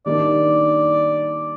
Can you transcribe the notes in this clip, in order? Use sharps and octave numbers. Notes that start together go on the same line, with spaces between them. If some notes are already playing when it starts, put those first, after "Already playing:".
D#3 G3 A#3 D4 D5